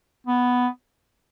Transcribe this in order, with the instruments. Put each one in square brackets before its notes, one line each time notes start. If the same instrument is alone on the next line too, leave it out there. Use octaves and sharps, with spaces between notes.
[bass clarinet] B3